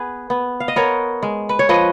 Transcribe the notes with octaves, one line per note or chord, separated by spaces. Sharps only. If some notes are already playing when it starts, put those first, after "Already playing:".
Already playing: B3 G#4 B4
B3
F5
D#5
B3 A#4 C#5
G#3
B4
C#5
F3 B4 D#5